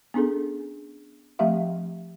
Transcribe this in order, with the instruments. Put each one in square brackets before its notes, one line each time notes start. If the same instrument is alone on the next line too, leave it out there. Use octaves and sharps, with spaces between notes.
[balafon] B3 C#4 D4 G#4 A4
F3 A3 C4 G4 E5 F5